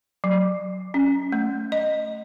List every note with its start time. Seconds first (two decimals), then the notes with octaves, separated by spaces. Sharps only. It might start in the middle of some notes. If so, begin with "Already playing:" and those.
0.24 F#3
0.94 C#4
1.32 A3
1.72 D#5